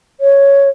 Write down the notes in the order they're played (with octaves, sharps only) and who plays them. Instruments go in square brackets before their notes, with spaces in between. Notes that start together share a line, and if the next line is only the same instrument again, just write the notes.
[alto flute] C#5